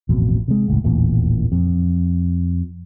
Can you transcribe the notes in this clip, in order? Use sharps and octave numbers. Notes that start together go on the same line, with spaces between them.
D#1 A1 F2 B2
C3 G#3
F#1 C#2 A2
D#1 A1 E2 A#2
F2